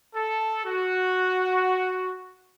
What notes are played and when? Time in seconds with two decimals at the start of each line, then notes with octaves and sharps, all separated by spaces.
0.14 A4
0.65 F#4